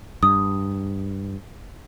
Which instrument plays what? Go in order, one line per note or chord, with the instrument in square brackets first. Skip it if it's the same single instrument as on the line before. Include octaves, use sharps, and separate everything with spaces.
[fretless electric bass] G2 [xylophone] D#6